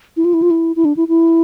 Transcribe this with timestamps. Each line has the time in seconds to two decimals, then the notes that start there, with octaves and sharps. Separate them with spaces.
0.17 E4
0.25 F4
0.34 E4
0.42 F4
0.51 E4
0.76 E4
0.85 D4
0.97 E4
1.08 E4